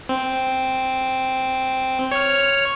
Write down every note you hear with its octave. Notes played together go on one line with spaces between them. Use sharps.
C4
C#5 F6